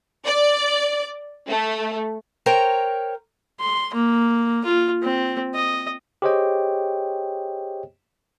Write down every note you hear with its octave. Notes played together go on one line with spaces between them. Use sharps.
D5
A3
A#4 C5 C#5 G5 A#5
C6
A#3
F4
C4
D#5
G4 G#4 C5 C#5 D#5 G5